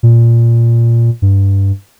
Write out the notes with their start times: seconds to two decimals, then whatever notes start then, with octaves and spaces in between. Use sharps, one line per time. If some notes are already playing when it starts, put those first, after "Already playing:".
0.03 A#2
1.22 G2